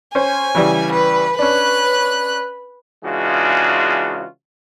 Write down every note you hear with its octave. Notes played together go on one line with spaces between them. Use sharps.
C#4 C5 G#5
C#3 E3 G3
B4
C#4 D4 B4 F#6
C#3 E3 G#3 D4 F4 F#4